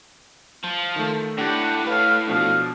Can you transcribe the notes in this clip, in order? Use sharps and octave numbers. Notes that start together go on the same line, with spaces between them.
F3
D#3 A3
A2 D4 G4 F#5
B4 C#5 F5
B2 F3 D4 F5